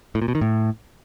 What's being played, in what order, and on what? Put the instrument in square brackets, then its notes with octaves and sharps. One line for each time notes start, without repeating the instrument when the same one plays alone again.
[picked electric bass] A2
A#2
B2
D#3
A2